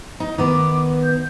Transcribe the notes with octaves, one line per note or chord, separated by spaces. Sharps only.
D#4
D#3 B3 D6
G6